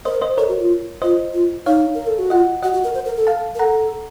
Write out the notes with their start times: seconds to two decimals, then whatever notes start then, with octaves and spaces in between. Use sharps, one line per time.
0.05 A#4 C5 D#5
0.22 C5 D#5
0.38 A4 A#4 C#5
0.49 F#4
0.59 F4
1.02 F4 C5 D#5
1.34 F4
1.66 D#4 C#5 F5
1.94 A#4
2.07 A4
2.19 F#4
2.30 F4 D#5 F#5
2.62 F#4 D#5 F#5
2.73 F#4
2.84 A#4
2.94 C5
3.05 A#4
3.17 A4
3.27 F5 A5
3.55 A#4
3.59 A4 F#5 A#5